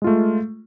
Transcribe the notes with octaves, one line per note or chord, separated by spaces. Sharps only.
G#3 A3 F4